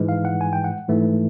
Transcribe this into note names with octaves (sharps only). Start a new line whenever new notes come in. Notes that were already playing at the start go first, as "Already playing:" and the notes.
Already playing: G#2 E3 G#3
F5
F#5
G#5
G5
F#5
G#2 E3 A3